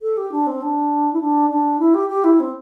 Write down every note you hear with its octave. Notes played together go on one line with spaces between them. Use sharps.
A4
G4
D4
C4
D4
E4
D4
D4
E4
G4
G4
E4
C4